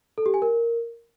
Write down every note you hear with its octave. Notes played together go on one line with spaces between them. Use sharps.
A4
G4
G#5
A#4